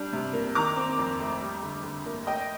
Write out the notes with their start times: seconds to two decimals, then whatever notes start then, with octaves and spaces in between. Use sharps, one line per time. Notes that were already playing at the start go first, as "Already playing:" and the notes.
Already playing: G3 D4
0.13 C3
0.33 A#3
0.55 D#3 A#5 D6
0.76 C4
0.98 F2
1.19 A3
1.41 G3
1.63 D3
1.83 D3
2.06 A#3
2.27 A3 D#5 G5